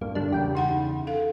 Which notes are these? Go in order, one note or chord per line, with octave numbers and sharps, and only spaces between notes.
G2 A#3
D3 G3 D4
E2 C#3 G4 G5
D#4 F#5 B5
A4 F5